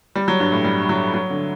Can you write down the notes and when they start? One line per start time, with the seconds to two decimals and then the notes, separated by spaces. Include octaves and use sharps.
0.16 G3
0.28 F#3
0.40 G2
0.52 A2
0.64 G3
0.89 F#3
1.14 F#3
1.30 D3